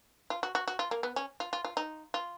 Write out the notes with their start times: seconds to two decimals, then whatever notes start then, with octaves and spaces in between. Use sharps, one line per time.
0.30 F4
0.43 F#4
0.55 F#4
0.68 F#4
0.79 F4
0.91 A#3
1.03 B3
1.16 C#4
1.40 F4
1.53 F4
1.65 F4
1.77 D#4
2.14 F4